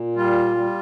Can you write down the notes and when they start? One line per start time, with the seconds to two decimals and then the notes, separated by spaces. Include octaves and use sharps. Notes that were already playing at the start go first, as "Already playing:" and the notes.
Already playing: A#2
0.16 G3 F4
0.57 G3